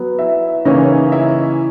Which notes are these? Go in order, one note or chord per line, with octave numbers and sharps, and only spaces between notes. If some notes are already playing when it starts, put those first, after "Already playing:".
Already playing: F#3 B3
E4 E5
C#3 E3 A#3 C#4 D#4 E4 D#5
E4 E5